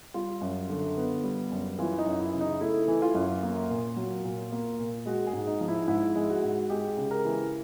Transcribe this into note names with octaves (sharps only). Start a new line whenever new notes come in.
G3 F4
F#2
D3
B3
G3
F#2
E3 F4
D#4
F#2
E4
C#3
D#4
A3 E4
E3
F4
F#2
A#3
A#2
F#3
A#2
A#3
A#2
G#3 F#4
G#4
G#2
D#4
F3
E4
G#2 E4
G#3
F#4
G#2
G#3 G4
C#3
A#4
E3